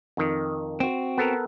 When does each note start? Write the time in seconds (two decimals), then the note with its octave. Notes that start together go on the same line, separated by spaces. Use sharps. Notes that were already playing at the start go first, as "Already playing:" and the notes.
0.17 F2 D#3
0.80 C4 F#4
1.18 B3 A4 A#4